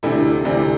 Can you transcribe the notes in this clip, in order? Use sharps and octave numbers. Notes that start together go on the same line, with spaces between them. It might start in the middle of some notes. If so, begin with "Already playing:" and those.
D2 C3 E3 A3 E4
D2 C3 E3 A3 D4